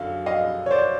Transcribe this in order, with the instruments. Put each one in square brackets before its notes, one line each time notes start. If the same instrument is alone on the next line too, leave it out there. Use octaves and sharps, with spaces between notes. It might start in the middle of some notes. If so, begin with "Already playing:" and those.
Already playing: [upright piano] F#2 D3 F#3 F5
D#5 F5
C#5
C5 D5